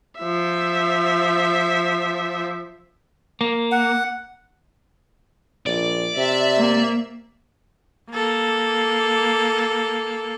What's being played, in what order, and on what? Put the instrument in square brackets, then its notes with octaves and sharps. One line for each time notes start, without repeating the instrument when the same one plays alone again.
[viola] F3 E5
[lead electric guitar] A#3
[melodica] F#5
[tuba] A#1 [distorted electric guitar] D5
[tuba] C3 [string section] E5
[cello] A#3
[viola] A#3 A4